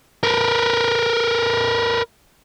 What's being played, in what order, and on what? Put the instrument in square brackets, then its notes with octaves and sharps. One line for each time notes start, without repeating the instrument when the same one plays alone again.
[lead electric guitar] A#4 B4